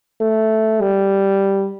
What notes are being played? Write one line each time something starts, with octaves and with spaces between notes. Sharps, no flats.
A3
G3